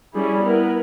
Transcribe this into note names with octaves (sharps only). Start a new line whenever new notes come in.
G3 C#4 E4 G#4
B3 E4 A#4